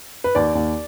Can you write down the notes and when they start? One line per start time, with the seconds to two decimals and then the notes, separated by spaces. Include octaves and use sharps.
0.24 B4
0.35 D#2 D5
0.55 D#2